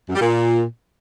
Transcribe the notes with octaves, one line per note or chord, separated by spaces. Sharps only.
F#2
G3
A#2